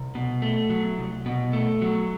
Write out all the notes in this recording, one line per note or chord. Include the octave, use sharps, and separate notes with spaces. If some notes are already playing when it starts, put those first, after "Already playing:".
Already playing: C2
B2
A3
F#3
C2
B2
A3
F#3